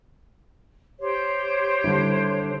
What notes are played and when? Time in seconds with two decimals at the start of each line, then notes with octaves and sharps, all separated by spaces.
0.99 G4 C5 C#5
1.84 D3 G3 E4